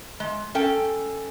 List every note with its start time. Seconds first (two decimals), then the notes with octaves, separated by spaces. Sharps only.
0.20 G#3
0.55 C#4 A4 G5